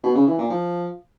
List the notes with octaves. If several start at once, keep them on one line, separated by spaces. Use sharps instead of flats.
B2
C#3
E3
A#2
F3